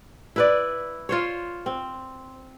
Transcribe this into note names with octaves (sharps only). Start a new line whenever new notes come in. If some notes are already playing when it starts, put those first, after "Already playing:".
E4 B4 D5
F4 C5 C#5
C4